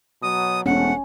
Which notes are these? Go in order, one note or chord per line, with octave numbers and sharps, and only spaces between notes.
B2 F#3 D#6
E1 G#2 C3 A3 C#4 F#5